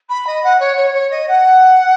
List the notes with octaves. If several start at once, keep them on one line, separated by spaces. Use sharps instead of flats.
B5
D#5
F#5
C#5
C#5
C#5
D#5
F#5